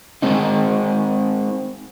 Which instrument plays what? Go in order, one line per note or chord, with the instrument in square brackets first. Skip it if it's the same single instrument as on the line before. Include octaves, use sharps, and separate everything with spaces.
[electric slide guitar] G#3 C4 D#4